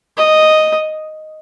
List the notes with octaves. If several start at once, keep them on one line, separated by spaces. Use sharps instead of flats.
D#5